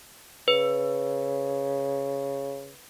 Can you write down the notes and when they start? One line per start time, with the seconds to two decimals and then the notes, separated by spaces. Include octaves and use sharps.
0.48 C#3 B4